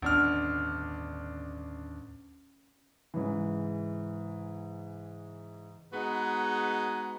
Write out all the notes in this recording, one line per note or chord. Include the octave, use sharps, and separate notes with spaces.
G1 D#2 A2 B3 C#4 D4 F6
G#2 C#3 E3
G#3 B3 D#4 F#4 G#4 B4